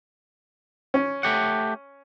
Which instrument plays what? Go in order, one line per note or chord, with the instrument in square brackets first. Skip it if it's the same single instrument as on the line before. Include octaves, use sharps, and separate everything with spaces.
[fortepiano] C#4
[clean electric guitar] A3 G4 F#5